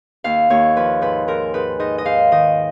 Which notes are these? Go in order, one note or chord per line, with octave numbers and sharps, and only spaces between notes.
D#2 F5
D#2 C#5
F3 B4
G#2 B4
G#2 A#4
G#2 B4
G#2 D#5
D#5
G#2 F5
D#3 D#5